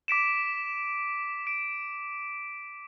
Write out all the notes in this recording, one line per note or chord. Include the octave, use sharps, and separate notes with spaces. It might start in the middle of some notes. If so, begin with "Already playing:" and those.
D6 B6 D7 E7
D7